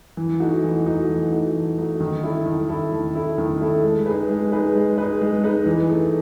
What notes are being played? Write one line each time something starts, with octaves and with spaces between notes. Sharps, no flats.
E3
A3 D#4 F#4
E3
A3 D#4 F#4
E3
A3 D#4 F#4
E3
A3 D#4 F#4
D#3
A3 E4 A4
D#3
A3 E4 A4
D#3
A3 E4 A4
D#3
A3 E4 A4
G#3
D#4 G#4 B4
G#3
D#4 G#4 B4
G#3
D#4 G#4 B4
G#3
D#4 G#4 B4
E3
A3 D#4